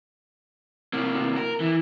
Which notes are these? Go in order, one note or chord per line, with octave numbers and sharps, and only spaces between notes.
C3 A#3
C3 A#3
A#4
E3